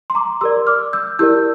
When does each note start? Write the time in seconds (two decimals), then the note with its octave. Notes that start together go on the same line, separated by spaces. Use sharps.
0.10 C6
0.15 A#5 D6
0.41 G4 A#4 D5 C6 E6
0.67 D6 F6
0.93 E6 G6
1.19 E4 G4 A#4 D5 E6 G6